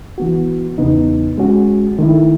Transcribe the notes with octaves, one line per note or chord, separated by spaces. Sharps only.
E3 B3 F#4
E2 C#3 E3 B3 D#4
G#3 C#4 F#4
D#3 A3 E4